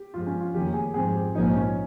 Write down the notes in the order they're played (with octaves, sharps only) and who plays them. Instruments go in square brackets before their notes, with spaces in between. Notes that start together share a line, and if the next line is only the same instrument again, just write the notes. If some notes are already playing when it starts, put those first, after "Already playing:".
Already playing: [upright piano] G4
[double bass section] G2 F3 G#3 [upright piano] F4
[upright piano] C#4
F4
[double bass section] F1 F2 D#3 A#3 C#4 [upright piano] G4
[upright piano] G#4
[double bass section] G#2 F3 C4 [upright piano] G#4
[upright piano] G4
[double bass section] A#1 G#2 F3 A#3 C#4 [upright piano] D#4
[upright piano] C#4